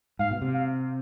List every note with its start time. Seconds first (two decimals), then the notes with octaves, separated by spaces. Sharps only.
0.19 G#2 F5
0.31 B2
0.42 C3
0.54 F5